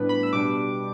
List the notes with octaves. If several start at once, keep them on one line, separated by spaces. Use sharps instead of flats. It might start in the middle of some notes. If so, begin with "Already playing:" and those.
Already playing: A2 G3 B3 D4 B4
B5
E6
B2 G3 D4 D6